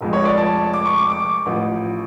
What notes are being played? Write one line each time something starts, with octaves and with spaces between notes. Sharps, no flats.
F1 F2 F3 G#3
C#5
D5
A5
D6
C#6
D6
D6
A1 A2 F3